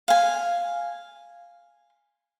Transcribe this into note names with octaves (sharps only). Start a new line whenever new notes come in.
F5 G#5